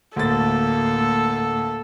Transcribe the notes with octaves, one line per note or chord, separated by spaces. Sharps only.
D2 A2 A#3 A4 A6